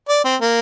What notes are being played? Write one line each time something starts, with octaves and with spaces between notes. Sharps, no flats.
D5
C4
A#3